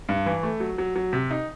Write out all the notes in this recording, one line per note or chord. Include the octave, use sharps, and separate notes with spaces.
G2
E3
A3
F#3
F#3
F#3
C3
D#4